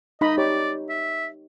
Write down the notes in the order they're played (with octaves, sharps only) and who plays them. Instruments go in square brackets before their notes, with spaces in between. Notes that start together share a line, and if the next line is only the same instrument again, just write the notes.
[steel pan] D#4 B5 [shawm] D#5
[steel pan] G4 C#5 [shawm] D5
[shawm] E5